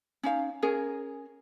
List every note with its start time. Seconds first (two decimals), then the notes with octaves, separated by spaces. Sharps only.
0.23 C#4 D#4 F5
0.62 C#4 G#4 A#4